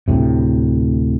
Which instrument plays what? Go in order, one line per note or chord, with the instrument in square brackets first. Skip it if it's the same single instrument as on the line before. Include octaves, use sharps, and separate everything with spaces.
[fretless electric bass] D2 A2 C3